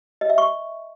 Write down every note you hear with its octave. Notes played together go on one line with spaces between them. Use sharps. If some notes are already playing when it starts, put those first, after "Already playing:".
D#5
E5
C#6